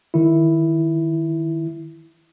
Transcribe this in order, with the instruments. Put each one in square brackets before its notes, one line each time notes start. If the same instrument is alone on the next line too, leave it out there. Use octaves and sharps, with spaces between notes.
[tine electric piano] D#3 E4